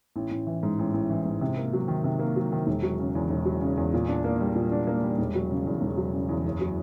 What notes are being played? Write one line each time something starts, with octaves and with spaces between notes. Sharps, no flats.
A1
A1
E3
G#2
A1
A1
E3
G#2
C3
A#3
F#3
D#3
C3
A#3
F#3
D#3
E1
F#3
C#3
E2
E1
F#3
C#3
E2
A#2
D4
A#3
G3
A#2
D4
A#3
G3
E1
F#3
C#3
E2
E1
F#3
C#3
E2
F#1
F#3